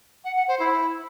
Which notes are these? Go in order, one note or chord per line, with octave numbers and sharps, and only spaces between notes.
F#5
F#5
C5
E4